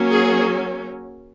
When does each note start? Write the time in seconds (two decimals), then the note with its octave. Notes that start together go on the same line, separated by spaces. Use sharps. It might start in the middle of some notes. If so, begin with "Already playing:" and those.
Already playing: F#3 A#3 C#4
0.09 G#4